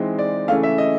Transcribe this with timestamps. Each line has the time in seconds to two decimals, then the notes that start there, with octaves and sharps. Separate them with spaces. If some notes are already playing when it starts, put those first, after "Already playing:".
Already playing: E3 G#3 C4 D#4
0.19 D5
0.48 C#3 E3 A3 F5
0.63 E5
0.78 D#5